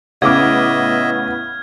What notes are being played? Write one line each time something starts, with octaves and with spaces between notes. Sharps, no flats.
A2 C#3 B3 D#5 E5 D6 F6 G#6